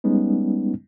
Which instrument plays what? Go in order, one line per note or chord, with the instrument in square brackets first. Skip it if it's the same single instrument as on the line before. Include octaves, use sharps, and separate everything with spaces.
[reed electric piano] G3 G#3 B3 C#4 D#4